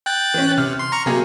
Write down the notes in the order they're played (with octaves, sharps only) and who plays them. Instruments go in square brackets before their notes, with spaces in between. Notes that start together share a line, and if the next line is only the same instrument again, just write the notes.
[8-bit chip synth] G5 F#6 A6
[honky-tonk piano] E3 C#4
[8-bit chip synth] C3 [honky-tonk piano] F6
[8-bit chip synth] C6
A#5 C#6 F6
[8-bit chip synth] C3 [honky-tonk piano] F#3 A#3 G#4